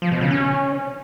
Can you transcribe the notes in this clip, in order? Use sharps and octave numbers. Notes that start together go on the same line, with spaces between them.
F3
B2
C#3
C#4